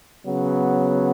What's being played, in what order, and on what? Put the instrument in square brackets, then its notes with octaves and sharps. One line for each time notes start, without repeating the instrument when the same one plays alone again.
[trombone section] C#3 F#3 B3